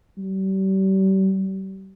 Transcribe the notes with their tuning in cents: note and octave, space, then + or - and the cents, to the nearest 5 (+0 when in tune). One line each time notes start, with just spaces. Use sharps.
G3 -35